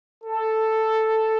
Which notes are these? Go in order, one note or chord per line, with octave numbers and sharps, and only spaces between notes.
A4